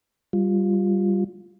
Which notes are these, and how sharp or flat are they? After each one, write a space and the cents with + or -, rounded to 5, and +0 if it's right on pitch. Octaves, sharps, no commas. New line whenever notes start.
G3 +0 F4 +0